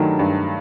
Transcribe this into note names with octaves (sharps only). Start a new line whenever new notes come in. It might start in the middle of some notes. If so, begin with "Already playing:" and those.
Already playing: G2 D#3 F#3 A3
G2